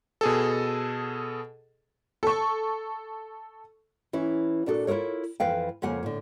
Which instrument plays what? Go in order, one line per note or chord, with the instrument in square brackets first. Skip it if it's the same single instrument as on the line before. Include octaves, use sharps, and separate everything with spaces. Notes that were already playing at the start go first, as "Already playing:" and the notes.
[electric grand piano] B2 G#4 A4
[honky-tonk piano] A4 C#6
[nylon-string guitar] E3 C#4 E4
A#2 D4 F#4 A4
E4 F4 G#4 A#4 C#5
F2 E3 B4 F5 G5
F2 C#3 A#3 F#5 G#5
A2 D3